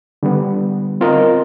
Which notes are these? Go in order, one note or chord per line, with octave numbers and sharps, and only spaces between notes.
D3 G3 B3
C4 F4 A#4 D#5